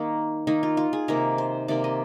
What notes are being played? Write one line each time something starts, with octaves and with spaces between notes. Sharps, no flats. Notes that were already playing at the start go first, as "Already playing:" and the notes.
Already playing: D#3 G3 A#3
D#3 A#3 D#4
F4
F4
G#4
C3 D#3 A#3 A#4
C5
C3 D#3 A#3 D5
D#5